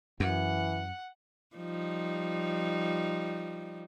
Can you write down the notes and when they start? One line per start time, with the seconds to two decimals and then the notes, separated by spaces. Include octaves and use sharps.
0.20 F#2 E3 F#5
1.56 F3 G3 D#4